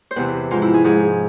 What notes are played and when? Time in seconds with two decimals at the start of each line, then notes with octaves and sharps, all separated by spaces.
0.11 C5
0.16 E2 C3 E3 B4
0.51 G#2 F3 F4
0.62 E4
0.74 G#4
0.84 G#2 F3 G#4